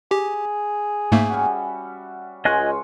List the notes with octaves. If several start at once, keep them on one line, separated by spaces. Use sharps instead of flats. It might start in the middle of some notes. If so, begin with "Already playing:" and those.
G4 G#4
G#2 A3 A#3 E5
G3 C#4 F#4
C#2 G#3 F4 D#5 G#5 C#6 F#6